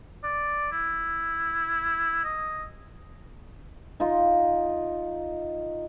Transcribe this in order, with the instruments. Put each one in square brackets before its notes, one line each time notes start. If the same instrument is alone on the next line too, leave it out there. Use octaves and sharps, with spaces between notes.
[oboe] D5
E4
D#5
[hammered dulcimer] D#4 F4